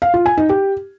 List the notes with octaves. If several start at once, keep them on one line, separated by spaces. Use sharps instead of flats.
F5
F4
G#5
D#4
G4